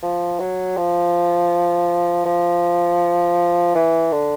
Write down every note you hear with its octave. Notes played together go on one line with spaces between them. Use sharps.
F3
F#3
F3
F3
E3
D3